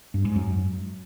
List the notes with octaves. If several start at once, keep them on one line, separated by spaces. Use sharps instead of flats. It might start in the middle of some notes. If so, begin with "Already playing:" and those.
G2
G#2
F#2